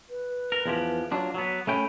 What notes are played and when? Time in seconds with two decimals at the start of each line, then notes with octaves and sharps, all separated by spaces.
0.10 B4
0.52 A#4
0.66 E2 F3 G4
1.11 F#3 D4 F4
1.34 F#3 B3
1.67 A3 C#4 G5 B5